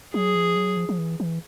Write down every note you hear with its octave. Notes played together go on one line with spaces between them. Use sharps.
F#3 G#4
F3
F#3
F3
F3
E3
E3